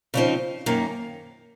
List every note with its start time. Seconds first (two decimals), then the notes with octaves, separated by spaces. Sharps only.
0.14 C#3 F3 C4 D#4
0.66 F#2 D#3 A#3